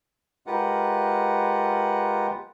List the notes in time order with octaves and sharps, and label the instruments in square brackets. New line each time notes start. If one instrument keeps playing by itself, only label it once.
[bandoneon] G#3 F4 G4 A#4 B4 F#5